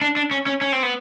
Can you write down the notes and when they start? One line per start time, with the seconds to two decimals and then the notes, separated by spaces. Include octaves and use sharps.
0.01 D4
0.16 D4
0.31 C#4
0.46 C#4
0.61 C#4
0.72 C4
0.83 B3